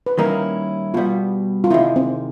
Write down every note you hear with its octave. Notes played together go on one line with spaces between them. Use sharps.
B4
D#3 G3 A#3 C#4 E4 A#4
B2 G3 B3 F4
F4
C3 D#3 G#3 E4
C4